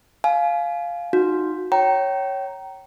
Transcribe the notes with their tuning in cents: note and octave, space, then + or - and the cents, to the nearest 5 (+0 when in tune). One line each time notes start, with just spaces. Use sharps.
F5 +0 G#5 +30
D#4 +0 F#4 -20
C#5 +0 G5 -30 A#5 +0